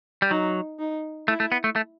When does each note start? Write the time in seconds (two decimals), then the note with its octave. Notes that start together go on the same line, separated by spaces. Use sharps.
0.22 G3
0.30 F#3 D#4
0.79 D#4
1.28 A3 E4
1.40 A3
1.52 B3
1.64 A3
1.76 A3